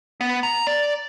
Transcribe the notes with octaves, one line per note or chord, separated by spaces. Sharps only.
B3
A#5
D5